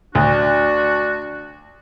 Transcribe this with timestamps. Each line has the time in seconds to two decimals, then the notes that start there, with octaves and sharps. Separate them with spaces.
0.15 D2 D4 F#4